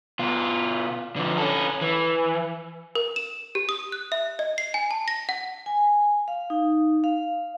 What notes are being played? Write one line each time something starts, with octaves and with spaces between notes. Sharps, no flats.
B2 F4
D3 F3
C#4 A4
E3
A#4
E7
G4
D#6
F#6
E5
D#5
C7
G#5
A5
A#6
F#5
G#5
F5
D#4
F5